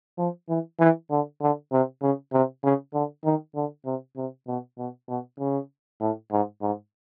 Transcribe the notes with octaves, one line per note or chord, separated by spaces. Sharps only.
F3
E3
E3
D3
D3
C3
C#3
C3
C#3
D3
D#3
D3
C3
C3
B2
B2
B2
C#3
A2
G#2
G#2